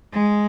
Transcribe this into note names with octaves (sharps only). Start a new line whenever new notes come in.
G#3